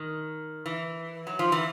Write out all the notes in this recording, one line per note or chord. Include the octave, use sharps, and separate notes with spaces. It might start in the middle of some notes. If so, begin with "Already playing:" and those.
Already playing: D#3
E3
F#3
F3
E3